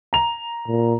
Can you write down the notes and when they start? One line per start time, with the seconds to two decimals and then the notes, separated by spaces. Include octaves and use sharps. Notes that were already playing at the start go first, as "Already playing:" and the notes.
0.13 A#5 F7
0.68 A#2